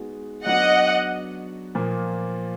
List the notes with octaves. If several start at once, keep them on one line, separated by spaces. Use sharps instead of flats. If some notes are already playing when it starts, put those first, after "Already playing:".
Already playing: G#3 B3 D#4 F#4
F#3 B3 D4 F#4 D#5 F#5
A#2 F3 A#3